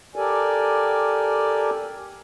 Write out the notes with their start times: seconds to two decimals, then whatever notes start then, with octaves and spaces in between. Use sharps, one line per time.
0.16 G4 A4 A#4 D5 G#5